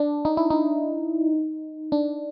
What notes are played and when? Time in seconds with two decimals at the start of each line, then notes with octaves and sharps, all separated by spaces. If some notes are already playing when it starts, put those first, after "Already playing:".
Already playing: D4
0.25 D#4
0.37 E4
0.50 D#4
1.92 D4